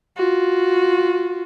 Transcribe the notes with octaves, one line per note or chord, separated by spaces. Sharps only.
F4 F#4